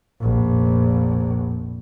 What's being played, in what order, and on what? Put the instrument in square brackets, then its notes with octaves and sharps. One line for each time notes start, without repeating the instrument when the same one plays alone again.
[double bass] F1 A#1